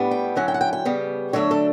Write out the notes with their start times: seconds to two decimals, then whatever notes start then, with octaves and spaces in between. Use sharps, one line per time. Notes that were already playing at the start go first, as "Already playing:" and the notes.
Already playing: A2 G3 B3 D4
0.11 G5
0.35 D3 F#3 C#4 E4 F#5
0.48 G5
0.54 F#5
0.61 G5
0.73 G5
0.85 C#3 G3 B3
1.33 D3 F#3 A3 D4 C#5
1.51 A4